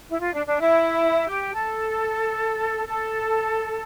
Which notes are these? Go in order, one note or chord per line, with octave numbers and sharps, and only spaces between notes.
E4
F4
D4
D4
E4
G4
A4
A4